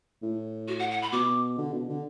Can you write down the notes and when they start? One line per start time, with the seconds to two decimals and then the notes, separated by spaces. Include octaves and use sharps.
0.22 A2
0.68 F#4
0.79 F#5
0.91 F#5
1.02 B5
1.13 B2 D6
1.58 D3
1.73 B2
1.89 D3